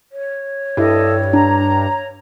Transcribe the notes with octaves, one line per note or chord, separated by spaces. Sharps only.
C#5
G2 E4 A4 D#5
D4 A#5